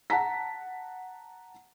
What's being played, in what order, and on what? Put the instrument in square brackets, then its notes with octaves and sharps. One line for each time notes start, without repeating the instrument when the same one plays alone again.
[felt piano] F#5 A5 A#5 B6